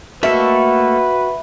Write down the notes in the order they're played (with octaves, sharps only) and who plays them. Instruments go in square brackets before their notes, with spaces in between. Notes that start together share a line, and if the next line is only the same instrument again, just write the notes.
[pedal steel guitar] A3 A#3 A4 [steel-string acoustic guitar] F#4 [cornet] B4 [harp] E5